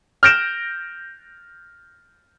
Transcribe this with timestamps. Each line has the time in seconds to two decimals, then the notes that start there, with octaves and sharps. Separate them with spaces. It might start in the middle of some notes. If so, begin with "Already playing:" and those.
0.23 F6 G6 A#6 D7 E7